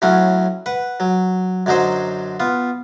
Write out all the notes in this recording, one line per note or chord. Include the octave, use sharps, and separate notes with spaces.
A2 F#3 C#4 F#5
B4 F#5
F#3
F#2 D3 F#3 D#4 C5
B3 F4